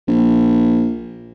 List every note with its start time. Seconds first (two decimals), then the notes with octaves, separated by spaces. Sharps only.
0.08 A#1